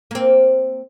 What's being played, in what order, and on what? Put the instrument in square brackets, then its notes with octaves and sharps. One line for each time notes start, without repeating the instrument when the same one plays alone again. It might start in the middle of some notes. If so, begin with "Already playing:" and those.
[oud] A#3 C4